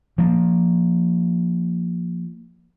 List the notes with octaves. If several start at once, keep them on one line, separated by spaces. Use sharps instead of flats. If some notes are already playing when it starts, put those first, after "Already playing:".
F3 A#3